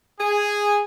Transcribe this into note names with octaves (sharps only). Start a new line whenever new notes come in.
G#4